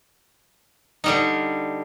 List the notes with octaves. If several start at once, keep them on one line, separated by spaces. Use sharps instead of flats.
D3 G3 D#4